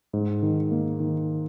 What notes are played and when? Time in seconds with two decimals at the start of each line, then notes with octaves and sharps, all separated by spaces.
0.13 G#2
0.43 D#3
0.71 A#3
1.00 D#3